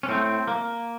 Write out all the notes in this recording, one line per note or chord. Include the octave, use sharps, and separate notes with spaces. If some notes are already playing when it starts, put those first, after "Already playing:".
C#4
A2 A3 C4
A#3